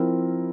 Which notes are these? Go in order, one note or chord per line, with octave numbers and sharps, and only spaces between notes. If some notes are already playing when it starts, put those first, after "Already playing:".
Already playing: F3 C4 E4 A#4